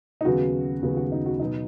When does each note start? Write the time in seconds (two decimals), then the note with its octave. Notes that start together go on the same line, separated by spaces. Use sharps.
0.21 D#4
0.25 D#2 C#3 F#3 B3 F#4
0.82 D#2 C#3 F#3 B3
0.97 F#4
1.12 D#4
1.26 F#4
1.40 B2 F#3 B3 D#4